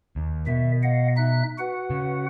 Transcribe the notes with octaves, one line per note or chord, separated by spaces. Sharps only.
D#2
B2 D#3 E5
D#5 F5 F#5
D#4 E5 F#6
F#4 B4 F#5
C#3